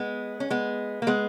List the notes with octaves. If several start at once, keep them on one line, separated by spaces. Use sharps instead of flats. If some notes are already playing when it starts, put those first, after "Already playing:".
Already playing: G#3 B3
C#4
G#3 B3
A#3
G#3 B3